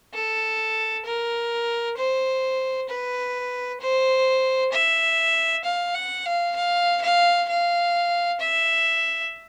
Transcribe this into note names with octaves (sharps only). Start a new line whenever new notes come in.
A4
A#4
C5
B4
C5
E5
F5
F#5
F5
F5
F5
F5
E5